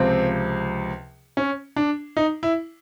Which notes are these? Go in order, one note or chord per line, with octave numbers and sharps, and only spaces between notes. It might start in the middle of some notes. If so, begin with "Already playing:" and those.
Already playing: C#2 C3 F3 C4
C#4
D4
D#4
E4